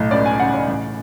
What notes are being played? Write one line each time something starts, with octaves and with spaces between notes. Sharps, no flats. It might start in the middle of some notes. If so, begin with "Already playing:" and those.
Already playing: B1 A2
C#2 D5
G#5
C#3 F#5
D5
A1